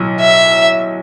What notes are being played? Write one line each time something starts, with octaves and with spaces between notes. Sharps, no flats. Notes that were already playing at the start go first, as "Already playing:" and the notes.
Already playing: B1 A2 F#3
E5